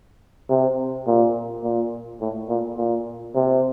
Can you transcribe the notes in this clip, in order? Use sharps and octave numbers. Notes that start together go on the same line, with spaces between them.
C3
A#2
A#2
A2
A#2
A#2
C3